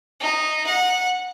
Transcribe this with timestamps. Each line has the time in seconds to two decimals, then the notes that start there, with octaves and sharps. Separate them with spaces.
0.20 D#4
0.66 F#5